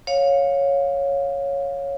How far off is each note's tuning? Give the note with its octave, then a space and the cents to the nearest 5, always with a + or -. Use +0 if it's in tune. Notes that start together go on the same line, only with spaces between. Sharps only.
C#5 +0 F5 +20